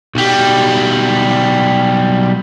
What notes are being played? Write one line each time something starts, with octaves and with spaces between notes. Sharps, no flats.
B1 G3